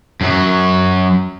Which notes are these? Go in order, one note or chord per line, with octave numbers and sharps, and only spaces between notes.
F#2 F#3